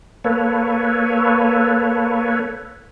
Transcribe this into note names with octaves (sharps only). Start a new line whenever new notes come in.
A#3 A4 B4 C#5